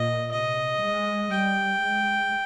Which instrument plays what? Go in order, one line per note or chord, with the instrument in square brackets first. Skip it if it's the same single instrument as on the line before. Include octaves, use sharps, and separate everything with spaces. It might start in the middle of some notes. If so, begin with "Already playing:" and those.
Already playing: [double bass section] A#2 [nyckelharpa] D#5
[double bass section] C3 [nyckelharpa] D#5
[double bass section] G#3
[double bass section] G3 [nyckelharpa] G5
[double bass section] G#3